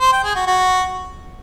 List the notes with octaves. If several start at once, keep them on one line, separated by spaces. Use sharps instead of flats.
C5
G5
G#4
F#4
F#4